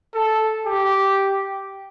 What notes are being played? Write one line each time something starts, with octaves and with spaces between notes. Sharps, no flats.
A4
G4